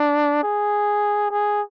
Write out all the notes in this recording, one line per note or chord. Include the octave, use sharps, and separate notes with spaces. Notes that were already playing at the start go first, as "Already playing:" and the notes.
Already playing: D4
G#4
G#4